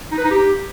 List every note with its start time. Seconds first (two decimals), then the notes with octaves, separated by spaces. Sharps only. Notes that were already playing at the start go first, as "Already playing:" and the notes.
0.12 D#4
0.18 B4
0.24 D#4
0.31 G4